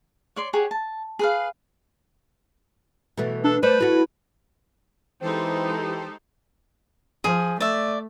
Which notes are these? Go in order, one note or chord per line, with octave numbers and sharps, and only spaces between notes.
C#5 D5 C6
G4 G#4 C#5 F#5
A5
G#4 B4 F5
B2 E3 A3
D4 A4
A3 B4 C5 D5
A3 E4 F#4
E3 G#3 C4 D#4 G4 A4 C5
F3 G#4
A3 D5 E5